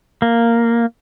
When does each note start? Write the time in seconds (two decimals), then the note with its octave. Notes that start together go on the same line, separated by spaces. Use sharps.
0.22 A#3